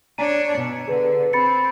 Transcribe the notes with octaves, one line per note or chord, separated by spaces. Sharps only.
D4 C#5 G#5 A#5 D#7
B2
D3 G#4 B4
C4 B5 A6 C#7